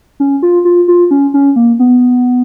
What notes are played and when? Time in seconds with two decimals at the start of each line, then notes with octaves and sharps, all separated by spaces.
0.20 C#4
0.43 F4
0.65 F4
0.88 F4
1.11 C#4
1.34 C#4
1.56 A#3
1.79 B3